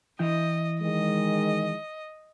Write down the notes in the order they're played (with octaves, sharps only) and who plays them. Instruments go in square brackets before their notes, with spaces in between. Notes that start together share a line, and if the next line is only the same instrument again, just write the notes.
[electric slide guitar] E3 E4 G5 [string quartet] D#5
[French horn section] D#3 G#3 [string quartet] D#5